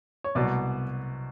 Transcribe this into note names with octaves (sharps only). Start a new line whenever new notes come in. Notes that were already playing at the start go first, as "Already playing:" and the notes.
C#5
C2 B2 F#3 D5